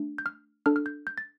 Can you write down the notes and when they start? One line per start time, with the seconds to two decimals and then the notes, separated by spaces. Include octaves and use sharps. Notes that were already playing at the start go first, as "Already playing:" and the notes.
Already playing: A3 D4
0.18 G6
0.26 F6
0.66 D4 A4 F6
0.76 F6
0.86 G6
1.07 G6
1.18 A6